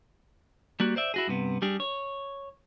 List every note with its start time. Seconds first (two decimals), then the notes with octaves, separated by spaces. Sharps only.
0.80 G3 A#3 F#4
0.96 C5 D5 E5
1.14 E4 F#4 G#4
1.27 G2 C3 B3
1.62 G3 D4 G4 G#4
1.80 C#5